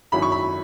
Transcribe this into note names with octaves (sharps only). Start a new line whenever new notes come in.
G#1 F#2 F#3 E4 B5
C#6
B5